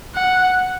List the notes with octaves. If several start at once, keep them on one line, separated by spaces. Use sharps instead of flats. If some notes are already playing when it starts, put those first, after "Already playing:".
F#5